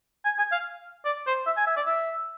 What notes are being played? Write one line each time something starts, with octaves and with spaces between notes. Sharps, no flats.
G#5
G#5
F5
D5
C5
E5
G#5
E5
D5
E5